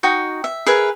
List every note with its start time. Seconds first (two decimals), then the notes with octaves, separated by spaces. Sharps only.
0.03 D#4 F#4 G5
0.44 E5
0.66 G#4 A#4 B4 E5